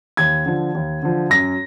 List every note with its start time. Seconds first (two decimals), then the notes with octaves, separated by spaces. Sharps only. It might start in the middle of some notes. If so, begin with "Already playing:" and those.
0.17 D#2 G#6
0.46 D3 F3
0.75 D#2
1.03 D3 F3
1.30 F#2 A#6